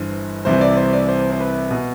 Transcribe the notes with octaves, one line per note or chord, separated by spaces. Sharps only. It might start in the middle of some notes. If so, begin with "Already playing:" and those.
Already playing: G1 G2 E3 C5
C2 C3 E3 C5
D5
C5
D5
C5
C5
B4
B2